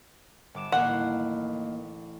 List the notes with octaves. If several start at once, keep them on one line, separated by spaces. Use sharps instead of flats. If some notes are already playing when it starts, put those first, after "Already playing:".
G1 D6 E7
A1 D#2 D#3 A#3 F5 F#5